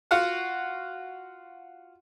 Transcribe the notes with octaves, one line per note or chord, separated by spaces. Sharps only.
F4 F#4 F5 F#5